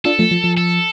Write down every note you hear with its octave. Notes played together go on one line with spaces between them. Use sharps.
D4 F4 A4
F3 A3
F3
F3
A4